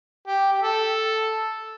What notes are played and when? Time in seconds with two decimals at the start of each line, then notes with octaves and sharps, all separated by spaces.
0.28 G4
0.53 G4
0.62 A4